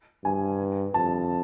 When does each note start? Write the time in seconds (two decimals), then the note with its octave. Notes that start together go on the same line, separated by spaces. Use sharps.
0.24 G2 G#5
0.94 F2 A5